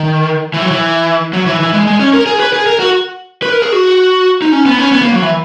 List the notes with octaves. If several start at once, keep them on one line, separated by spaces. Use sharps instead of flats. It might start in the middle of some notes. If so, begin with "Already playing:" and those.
Already playing: D#3
E3
F#3
E3
F#3
E3
E3
G#3
G#3
C#4
A#4
G#4
B4
G#4
A#4
F#4
B4
A#4
G#4
F#4
D#4
C#4
B3
C#4
B3
A#3
F#3
E3